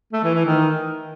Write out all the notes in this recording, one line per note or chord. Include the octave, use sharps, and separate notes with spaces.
A3
E3
E3
D#3